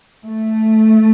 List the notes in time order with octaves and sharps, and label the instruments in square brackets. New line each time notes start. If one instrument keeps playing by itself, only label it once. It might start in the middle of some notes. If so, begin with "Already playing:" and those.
[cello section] A3